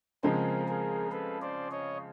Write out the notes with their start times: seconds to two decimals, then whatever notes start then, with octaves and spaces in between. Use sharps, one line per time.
0.23 C#3 F3 G#3 C4 G#4 A#4
0.68 G#4 A#4
1.12 A4 B4
1.42 C5 D5
1.71 C#5 D#5